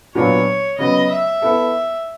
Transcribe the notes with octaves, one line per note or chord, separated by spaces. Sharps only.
A#2 F#3 B3 D4 F4 C#5
C#3 F#3 B3 D#5
E5
B3 E4 A4